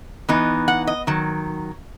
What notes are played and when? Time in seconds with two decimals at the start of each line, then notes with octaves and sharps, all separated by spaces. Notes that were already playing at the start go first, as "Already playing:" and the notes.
0.29 E3 B3 D#4
0.68 F#5
0.87 D#5
1.07 D#3 F#3